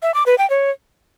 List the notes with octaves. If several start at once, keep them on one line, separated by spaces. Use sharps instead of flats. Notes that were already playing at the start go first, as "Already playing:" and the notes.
E5
D6
B4
G5
C#5